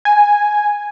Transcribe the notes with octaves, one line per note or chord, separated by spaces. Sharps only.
G#5